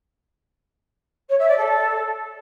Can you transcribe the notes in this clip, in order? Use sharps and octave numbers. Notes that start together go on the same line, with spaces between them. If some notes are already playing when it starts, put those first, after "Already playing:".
C#5
E5
D5
A4